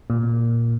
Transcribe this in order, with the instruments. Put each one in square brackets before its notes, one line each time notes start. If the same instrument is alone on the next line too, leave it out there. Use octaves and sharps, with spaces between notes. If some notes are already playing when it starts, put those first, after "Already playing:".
[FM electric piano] A#2